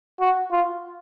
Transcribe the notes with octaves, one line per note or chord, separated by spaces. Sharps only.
F#4
F4